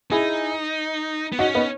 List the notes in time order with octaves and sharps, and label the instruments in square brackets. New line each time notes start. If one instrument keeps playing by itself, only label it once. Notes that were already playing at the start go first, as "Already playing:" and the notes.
[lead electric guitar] D#4 [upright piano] E4 G#4
[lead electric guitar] B3
[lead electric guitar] C#4 [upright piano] D#4 F#4
[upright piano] B3 D#4